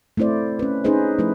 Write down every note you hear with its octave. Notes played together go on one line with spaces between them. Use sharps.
A3 C4 E4 C5 D5
C#4 B4
C#4 D#4 G#4 B4 C5 D#5
F3 A3 E4 B4